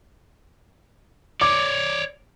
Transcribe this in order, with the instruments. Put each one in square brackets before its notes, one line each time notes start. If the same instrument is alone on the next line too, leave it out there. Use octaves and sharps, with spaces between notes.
[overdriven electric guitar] C#5 D5 [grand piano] D6